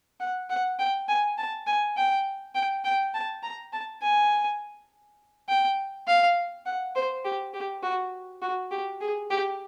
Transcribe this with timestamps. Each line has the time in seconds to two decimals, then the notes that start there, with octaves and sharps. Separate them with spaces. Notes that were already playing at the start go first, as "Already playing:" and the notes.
0.20 F#5
0.50 F#5
0.79 G5
1.08 G#5
1.37 A5
1.67 G#5
1.96 G5
2.55 G5
2.84 G5
3.14 A5
3.43 A#5
3.73 A5
4.02 G#5
5.49 G5
6.07 F5
6.65 F#5
6.95 C5
7.25 G4
7.54 G4
7.83 F#4
8.42 F#4
8.71 G4
9.01 G#4
9.30 G4